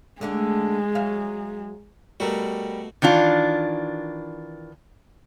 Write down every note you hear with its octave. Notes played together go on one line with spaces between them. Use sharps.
D3 G#3 A3 D4
F#3 E5 F5
B2 G3 A3 F#4 A#4
D#3 E3 D4 F4